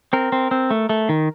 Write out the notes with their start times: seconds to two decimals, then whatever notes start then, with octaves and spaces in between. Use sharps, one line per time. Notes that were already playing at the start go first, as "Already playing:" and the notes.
0.13 C4 A#4
0.32 C4
0.51 C4
0.71 A3
0.89 A3
1.09 D#3